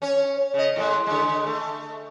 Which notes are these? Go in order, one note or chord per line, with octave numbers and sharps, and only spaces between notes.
C#4 C#5
C#3 D#5
A2 G#3
D3 G#3
A3